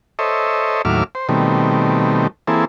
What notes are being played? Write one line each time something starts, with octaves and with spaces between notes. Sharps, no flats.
A4 C5 C#5 D#5 E5
D#2 A2 F#3 E5 D6 F6
C5
B2 D#3 G3 A3 C4
E3 A#3 C4 E4 G#4 A4